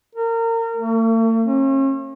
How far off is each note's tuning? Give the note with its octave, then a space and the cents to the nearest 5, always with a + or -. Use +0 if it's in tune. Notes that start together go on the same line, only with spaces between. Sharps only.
A#4 -30
A3 +45
C#4 -40